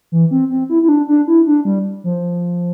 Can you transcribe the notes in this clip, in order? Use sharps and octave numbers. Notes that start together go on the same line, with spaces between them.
E3
C4
C4
E4
E4
D4
D4
E4
D4
G3
F3